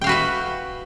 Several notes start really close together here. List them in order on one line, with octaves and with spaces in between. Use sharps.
G5 F5 F#4 B4 E5